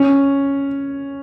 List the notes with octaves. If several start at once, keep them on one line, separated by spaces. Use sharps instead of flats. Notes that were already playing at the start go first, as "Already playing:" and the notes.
Already playing: C#4